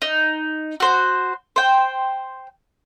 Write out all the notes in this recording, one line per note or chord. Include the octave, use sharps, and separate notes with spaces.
D#4
F#4 C5
C5 G5